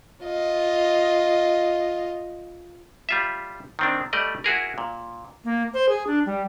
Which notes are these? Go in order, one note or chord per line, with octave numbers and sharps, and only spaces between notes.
F4 D#5
G3 F4 E5
D#3 C4 D4
G3 A3 D5 D#5
E4 F#4 G#4 A#4
A#2
A#3
C5
G#4
D4
G3